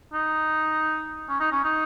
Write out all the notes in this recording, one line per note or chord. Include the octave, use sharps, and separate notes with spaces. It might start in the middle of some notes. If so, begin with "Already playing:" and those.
D#4
C#4
D#4
C#4
D#4